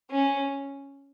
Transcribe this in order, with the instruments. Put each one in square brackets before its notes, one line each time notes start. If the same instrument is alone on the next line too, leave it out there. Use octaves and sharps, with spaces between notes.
[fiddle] C#4